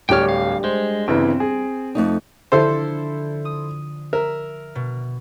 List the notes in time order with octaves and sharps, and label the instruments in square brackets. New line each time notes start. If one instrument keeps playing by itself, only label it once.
[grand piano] D1 C#5 [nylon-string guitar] G3 D4 G4 [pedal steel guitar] G5 F6
[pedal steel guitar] F5
[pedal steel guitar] G#3 [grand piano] C5
[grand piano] G1 C#3 E3 [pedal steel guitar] C4
[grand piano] G#4
[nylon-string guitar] F2 A3 D#4
[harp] D3 F3 [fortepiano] E4 A4 C5
[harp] D#6
[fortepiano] A#4 [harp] E5
[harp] B2